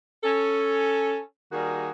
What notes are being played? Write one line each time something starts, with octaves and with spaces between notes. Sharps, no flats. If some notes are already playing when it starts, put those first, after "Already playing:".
C#4 A4
D#3 G3 A#3 F#4 G#4